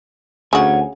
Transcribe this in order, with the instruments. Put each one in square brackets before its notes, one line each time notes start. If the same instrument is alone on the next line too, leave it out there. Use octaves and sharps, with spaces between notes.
[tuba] D2 [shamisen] C#3 F#4 [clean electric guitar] C#5 F#5 G#5